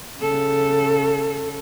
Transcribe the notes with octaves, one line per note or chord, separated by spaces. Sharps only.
C#3 A4